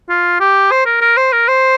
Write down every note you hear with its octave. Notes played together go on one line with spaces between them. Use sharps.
F4
G4
C5
A#4
A#4
C5
A#4
C5